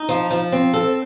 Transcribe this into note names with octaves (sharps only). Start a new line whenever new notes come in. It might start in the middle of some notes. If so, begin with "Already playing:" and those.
Already playing: D#4
F3
F3
C4
A4